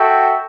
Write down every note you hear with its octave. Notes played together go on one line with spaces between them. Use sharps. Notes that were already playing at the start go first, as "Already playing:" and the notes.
Already playing: F#4 A4 E5 G5